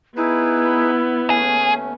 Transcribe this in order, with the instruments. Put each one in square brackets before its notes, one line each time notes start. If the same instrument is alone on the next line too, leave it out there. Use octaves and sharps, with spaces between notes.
[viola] B3 [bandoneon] D#4 G#4 B4 [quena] E4
[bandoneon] D#2 A3 C#4 [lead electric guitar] G#4